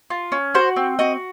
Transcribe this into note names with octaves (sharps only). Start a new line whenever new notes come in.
F4
C#4
F#4 C5
C4
F#4 D#5